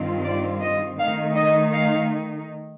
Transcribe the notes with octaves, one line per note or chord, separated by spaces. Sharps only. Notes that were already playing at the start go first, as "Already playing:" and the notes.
Already playing: G2 D#3 G3 C4 F4
D5
D#5
D#3 A3 D#4 F5
D#5
F5